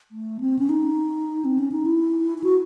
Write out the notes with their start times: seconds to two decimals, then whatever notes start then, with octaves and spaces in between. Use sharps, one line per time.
0.12 A3
0.40 C4
0.59 C#4
0.69 D#4
1.45 C4
1.59 C#4
1.72 D#4
1.85 E4
2.38 E4
2.44 F#4